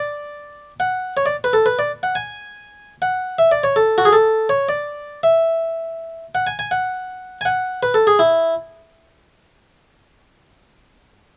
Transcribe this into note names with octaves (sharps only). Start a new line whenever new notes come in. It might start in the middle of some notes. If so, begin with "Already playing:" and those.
Already playing: D5
F#5
C#5
D5
B4
A4
B4
D5
F#5
G#5
F#5
E5
D5
C#5
A4
F#4
G#4
A4
C#5
D5
E5
F#5
G#5
G#5
F#5
G#5
F#5
B4
A4
G#4
E4